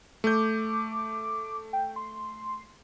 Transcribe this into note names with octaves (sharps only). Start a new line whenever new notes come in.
A3 D6 G6
G5
C6